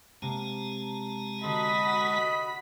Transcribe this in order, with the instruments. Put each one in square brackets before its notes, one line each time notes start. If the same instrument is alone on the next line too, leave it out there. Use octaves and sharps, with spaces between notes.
[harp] C3 A#3 [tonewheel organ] G#3 A5 A#5
[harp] D3 A4 C5 [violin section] F#4 B5 B6 [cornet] D#5